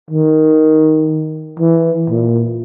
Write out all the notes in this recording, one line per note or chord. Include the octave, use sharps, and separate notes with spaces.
D#3
E3
A#2